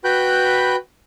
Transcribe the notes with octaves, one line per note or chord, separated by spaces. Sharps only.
F#4 B4 G5 B5 F#6 G6